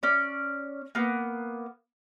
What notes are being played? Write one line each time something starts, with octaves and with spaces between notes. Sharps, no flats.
C#4 D5
A#3 B3